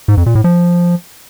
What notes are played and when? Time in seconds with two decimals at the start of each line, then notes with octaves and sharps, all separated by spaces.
0.08 G#2
0.17 F2
0.26 A#2
0.35 A2
0.44 F3